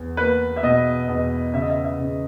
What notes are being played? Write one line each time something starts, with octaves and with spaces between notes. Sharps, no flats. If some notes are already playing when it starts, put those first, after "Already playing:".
Already playing: E2
A#3 B4
E5
B2 D#5
E2 D#5
C#3 E5
D#5
E5
E5
C#3